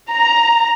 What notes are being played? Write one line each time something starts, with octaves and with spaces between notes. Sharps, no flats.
A#5